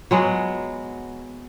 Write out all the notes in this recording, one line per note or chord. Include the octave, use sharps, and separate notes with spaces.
F#3 G#3 B3